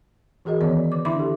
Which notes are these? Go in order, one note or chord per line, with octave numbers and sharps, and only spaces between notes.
E3 F#4 G#4 A#4 D#5
D#3 E3 B3 C#4 C#5 D5
D5
D3 D6
D4 E4 E5 B5 C6 D6
G4 A4